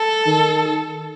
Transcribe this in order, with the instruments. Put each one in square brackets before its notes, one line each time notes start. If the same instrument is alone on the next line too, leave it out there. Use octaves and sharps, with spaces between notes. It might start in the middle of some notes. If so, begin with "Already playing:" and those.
Already playing: [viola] A4
[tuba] D#3